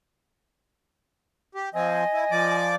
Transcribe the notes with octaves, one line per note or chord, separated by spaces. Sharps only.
G4
F3 C4 D#5 G#5
E4
F3 D5 D6